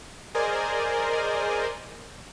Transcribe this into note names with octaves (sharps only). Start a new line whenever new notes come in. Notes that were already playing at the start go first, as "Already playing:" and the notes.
G#4 A#4 C5 D5 D#5 G#5